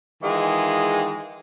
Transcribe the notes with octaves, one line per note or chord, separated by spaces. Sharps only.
D#3 E3 G#3 F4 G#4